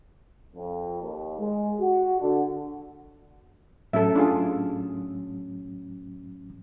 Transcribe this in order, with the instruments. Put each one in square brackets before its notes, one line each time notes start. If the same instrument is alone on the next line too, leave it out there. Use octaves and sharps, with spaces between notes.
[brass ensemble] F2
D#2
G#3
F#4
D3
[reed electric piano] A2 F#3 C#4 [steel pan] A4 E5
[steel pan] D4 F4 G#4